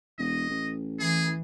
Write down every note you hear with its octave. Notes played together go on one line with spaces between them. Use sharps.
E1 D#5
A1
E3 G#4